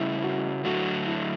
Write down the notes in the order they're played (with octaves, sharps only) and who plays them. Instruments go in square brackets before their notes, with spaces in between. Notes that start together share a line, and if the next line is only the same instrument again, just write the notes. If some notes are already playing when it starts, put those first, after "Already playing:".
Already playing: [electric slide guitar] C#3 G3 C#4 [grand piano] E4
[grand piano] F#4
[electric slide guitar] D3 F#3 A3 [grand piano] F#4
[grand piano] E4